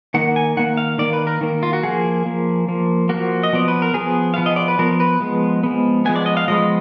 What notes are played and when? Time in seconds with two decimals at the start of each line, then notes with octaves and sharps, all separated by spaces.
0.14 D#3 A#3 F#5
0.36 G#5
0.57 D#3 A#3 F#5
0.77 F5
0.98 D#3 A#3 D5
1.13 B4
1.27 A#4
1.41 D#3 A#3
1.63 F4
1.73 F#4
1.83 F3 A#3 G#4
2.26 F3 A#3
2.68 F3 A#3
3.09 F3 A#3 F#4
3.43 D#5
3.53 F3 B3 D5
3.68 B4
3.82 A#4
3.94 F3 B3 G#4
4.34 F3 B3 F5
4.46 D#5
4.56 D5
4.68 B4
4.79 F3 B3 A#4
5.00 B4
5.20 F3 G#3 B3
5.63 F3 G#3 B3
6.05 F3 G#3 B3 G#5
6.16 D5
6.26 D#5
6.37 F5
6.48 F3 G#3 B3 D#5